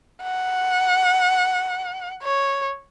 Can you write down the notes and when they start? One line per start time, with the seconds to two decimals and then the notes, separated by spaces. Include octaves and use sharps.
0.23 F#5
2.23 C#5